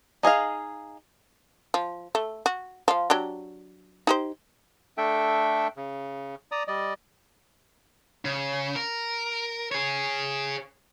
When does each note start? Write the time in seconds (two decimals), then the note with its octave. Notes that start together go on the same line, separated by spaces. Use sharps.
0.23 D#4 G#4 D#5 F5
1.74 F3
2.15 A3
2.46 F#4
2.88 F3 F5
3.10 F#3 D4 G4
4.07 D#4 G4 C5
4.98 A3 D4 A4 E5 G5
5.77 C#3
6.52 D5 A#5 D#6
6.68 G3 D5 D#5
8.25 C#3
8.76 A#4
9.72 G#4 C#5